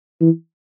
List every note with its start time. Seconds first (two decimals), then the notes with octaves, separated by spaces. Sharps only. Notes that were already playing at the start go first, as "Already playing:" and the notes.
0.21 E3